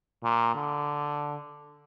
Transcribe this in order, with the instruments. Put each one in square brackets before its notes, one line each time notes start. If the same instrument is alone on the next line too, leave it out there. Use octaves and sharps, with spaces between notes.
[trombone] A#2
D3